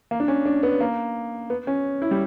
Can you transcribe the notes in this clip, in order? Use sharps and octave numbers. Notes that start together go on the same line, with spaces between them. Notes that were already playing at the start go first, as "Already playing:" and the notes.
A#3
D4
C#4
D4
B3
A#3
B3
C#4
E4
G3